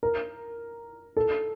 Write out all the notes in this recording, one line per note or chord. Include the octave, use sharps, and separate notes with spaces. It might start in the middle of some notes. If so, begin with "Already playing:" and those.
A#4
A4